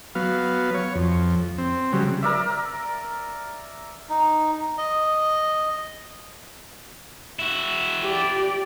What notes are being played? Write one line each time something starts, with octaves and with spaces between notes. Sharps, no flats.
F#3 B3 F5
C#5
F2
C4
C#3 F#3 G3
A#4 D5 E5
D#4
D#5
E4 F#4
G4 D5